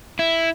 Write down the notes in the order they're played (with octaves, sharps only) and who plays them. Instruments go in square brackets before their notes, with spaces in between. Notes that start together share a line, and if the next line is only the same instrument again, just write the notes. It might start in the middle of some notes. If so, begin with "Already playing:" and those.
[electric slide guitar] E4